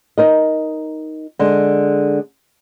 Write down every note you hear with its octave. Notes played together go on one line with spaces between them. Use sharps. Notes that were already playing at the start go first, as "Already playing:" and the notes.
D#4 A#4 D#5
D3 G#3